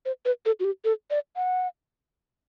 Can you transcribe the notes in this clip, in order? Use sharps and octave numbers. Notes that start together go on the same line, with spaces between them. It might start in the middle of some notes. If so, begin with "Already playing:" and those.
C5
B4
A4
F#4
G4
A4
D5
F#5